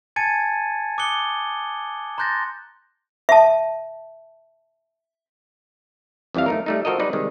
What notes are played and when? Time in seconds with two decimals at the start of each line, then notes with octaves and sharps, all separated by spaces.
0.16 G#5 A5 G#6 A6 C#7 D#7
0.98 D6 D#6 F#6 C#7 G7
2.18 A#5 C6 F#6 G6 A6 A#6
3.29 E5 A5
6.34 F2 E3 G3 E5 F5
6.46 A3 D#4 A#4
6.66 G3 A3 D#4
6.85 F3 F#4 A4 A#4 D#5
6.99 G3 D#4 B4 D5
7.13 C3 D#3 G3 G#3